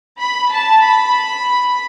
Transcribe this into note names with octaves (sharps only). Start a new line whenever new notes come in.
B5
A5
B5